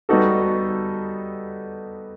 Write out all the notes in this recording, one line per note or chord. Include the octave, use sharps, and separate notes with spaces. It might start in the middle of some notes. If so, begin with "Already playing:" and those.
G3 B3 D#4 F#4 A4